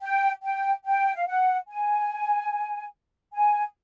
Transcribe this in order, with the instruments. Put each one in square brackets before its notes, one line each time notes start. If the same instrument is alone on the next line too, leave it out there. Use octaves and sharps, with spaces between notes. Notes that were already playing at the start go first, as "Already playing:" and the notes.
[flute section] G5
G5
G5
F5
F#5
G#5
G#5